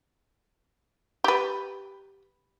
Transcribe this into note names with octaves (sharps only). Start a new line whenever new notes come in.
G4 B4